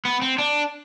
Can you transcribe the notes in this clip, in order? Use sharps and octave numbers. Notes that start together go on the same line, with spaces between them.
B3
C4
D4